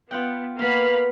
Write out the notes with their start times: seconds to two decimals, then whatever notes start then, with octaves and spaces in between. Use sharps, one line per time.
0.11 B3 F4 F#5 G5
0.59 A#3 B3 F4 F5 B5